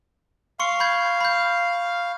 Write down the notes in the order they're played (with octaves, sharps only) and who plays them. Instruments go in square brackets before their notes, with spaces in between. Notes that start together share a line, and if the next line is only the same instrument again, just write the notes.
[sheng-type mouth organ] F5 [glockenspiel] C6 C#6 C#7
[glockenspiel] B5 G6 G#6
B5 G6